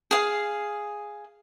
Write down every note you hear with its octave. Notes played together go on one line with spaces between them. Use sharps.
G#4 F5